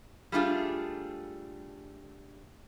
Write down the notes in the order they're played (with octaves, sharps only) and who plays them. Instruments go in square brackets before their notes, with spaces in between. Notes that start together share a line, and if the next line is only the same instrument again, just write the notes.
[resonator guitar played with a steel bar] G3 A3 D4 F4 G#4